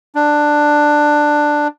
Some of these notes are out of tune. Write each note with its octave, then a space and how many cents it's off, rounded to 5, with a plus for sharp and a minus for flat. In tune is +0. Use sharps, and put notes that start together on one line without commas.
D4 +10